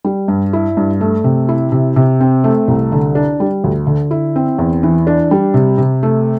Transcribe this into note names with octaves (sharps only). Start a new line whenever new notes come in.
G3
G2
E4
G2
A3
C3
E4
C3
C3
C4
A3
C2
D3
D4
G3
D2
D3
E4
C4
E2
E3
D4
G3
C3
C3
A3